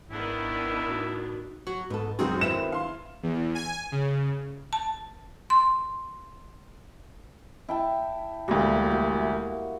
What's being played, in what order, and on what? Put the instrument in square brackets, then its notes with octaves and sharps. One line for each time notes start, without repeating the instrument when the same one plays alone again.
[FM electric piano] G#1 [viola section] D#3 B3 D4 [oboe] E4
[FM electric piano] A2 [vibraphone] D#4 F#4
[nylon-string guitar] F#3 [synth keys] F#4
[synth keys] G#2 [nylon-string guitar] B3 A4
[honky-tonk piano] C#2 F#2 F#4 [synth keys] D#3 C4 [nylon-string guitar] G#4
[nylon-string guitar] E4 B4 E5 [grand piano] E7
[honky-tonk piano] F5 C6
[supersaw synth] E2
G#5
C#3
[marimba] A5
C6
[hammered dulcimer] E4 G5 A5
[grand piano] E1 D2 [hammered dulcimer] G3 A#3
[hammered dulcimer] F#4